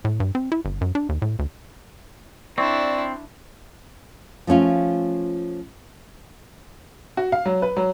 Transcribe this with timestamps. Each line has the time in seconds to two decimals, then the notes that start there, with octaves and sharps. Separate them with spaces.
0.05 A2
0.20 G2
0.35 C4
0.52 E4
0.65 G1
0.81 F#2
0.95 D4
1.09 D#2
1.22 A2
1.39 D2
2.58 C4 D4 E4 D5 C#6
4.47 F3 A3 C#4 F4
7.17 F#4
7.32 F5
7.45 F#3
7.62 B4
7.77 F#3